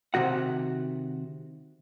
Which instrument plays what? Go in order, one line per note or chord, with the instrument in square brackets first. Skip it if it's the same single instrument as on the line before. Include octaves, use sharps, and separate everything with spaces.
[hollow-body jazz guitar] C3 D#3 F#4 F#5